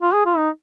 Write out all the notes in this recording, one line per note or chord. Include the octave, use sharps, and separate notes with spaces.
F4
G#4
F4
D#4